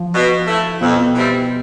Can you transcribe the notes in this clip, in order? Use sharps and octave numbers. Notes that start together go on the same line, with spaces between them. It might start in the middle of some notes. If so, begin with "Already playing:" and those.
Already playing: F3
B2
A3 E4
F2 B2
E3 G3 C4 E4